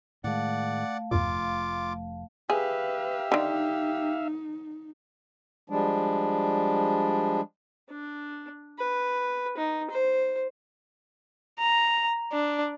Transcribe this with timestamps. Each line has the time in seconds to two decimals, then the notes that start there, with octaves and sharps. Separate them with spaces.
0.24 A2 D#3 G#3 A3 D5 F5 F#5 A5
1.11 F1 E2 G2 A#2 F4 D6
2.50 G4 G#4 B4 E5 F5
3.32 D3 D#3 D#4
5.70 F3 G3 G#3 D4
7.89 D4
8.78 B4
9.57 D#4
9.90 C5
11.60 A#5
12.32 D4